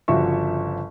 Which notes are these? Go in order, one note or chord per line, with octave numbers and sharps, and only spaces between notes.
G1 C#3 F3 F#4 E5 C#6